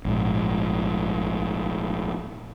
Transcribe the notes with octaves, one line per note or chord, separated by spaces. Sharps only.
A#1 G#2